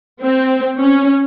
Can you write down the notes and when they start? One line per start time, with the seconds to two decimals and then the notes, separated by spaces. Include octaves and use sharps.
0.23 C4
0.80 C#4